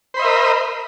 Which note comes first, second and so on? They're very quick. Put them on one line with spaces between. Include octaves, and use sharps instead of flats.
C5 B5 D#5 E5 A#4